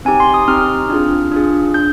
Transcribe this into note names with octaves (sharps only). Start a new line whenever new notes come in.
C4 D#4 G4 G#5
C6
D#6
C4 D#4 G4 F6
D4 F4 G#4
D4 F4 G#4
D4 G6